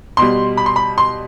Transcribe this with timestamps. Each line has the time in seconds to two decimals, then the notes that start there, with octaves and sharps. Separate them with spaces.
0.17 B2 G3 C6
0.57 B5
0.66 C6
0.76 B5
0.98 C6